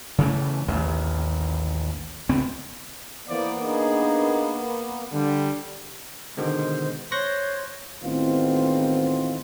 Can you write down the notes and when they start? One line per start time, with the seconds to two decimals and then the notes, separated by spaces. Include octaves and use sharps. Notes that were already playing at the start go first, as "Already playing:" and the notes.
0.18 C#3 E3 A3
0.68 A1 D#2
2.29 C#2 B3 C4
3.28 E3 A#3 B3 C5 D5
3.62 D4 D#4 G#4
5.12 D3 G3
6.37 B2 D3 D#3 G#3 C5
7.12 C5 C#5 C#6 F#6 A#6
8.04 A1 D#3 E3 B3 C4 F4